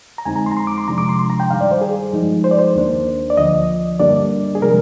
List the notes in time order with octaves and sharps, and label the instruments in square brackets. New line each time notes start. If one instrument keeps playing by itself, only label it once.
[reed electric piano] A#5
F2 D3 G#3 C4 D#4 G#5
A#5
C6
A#5
C6
D6
C6
C3 F3 G#3 D4 A#5
D6
C6
C6
A#5
G5
G2 D#3 G3 F5
D5
C5
G#4
G2 F3 G#3 D#4
C5
D5
C5
D#2 D#3 A#3 D4
D5
D2 D3 F3 D#5
G2 D3 G3 A#3 D4 D5
G#4
C3 F3 G#3 A#4